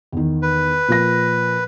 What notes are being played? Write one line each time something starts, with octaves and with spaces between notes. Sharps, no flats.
E2 D#3
B4
A#2 F3 A#6